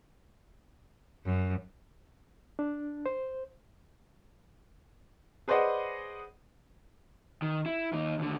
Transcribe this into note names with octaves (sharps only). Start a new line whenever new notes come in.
F#2
D4
C5
G#4 B4 C5 D5 D#5 F#5
D#3
E4
D#2 D#4
D#2 D3